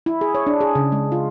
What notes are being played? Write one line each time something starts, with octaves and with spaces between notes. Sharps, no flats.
E4
G#4
C#5
D4
G#4
C#3
G#3
F4